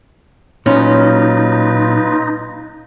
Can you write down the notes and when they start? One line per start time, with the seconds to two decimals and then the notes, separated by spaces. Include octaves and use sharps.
0.66 A#2 F#3 C#4 D#4 F4 B4